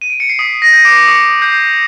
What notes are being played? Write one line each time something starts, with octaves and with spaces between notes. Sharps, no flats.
D#7
D7
C#7
C7
D#6 B6
A#6
G6 D#7
D6 D7
C7
C#6 D#6 C#7
G6 C7